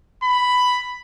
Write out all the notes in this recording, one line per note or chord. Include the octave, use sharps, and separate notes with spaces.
B5